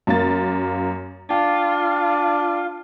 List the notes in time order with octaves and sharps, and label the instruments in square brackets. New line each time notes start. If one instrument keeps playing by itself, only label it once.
[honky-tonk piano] F#2 A#3 A6
[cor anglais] D4 [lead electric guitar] F4 [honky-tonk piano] G5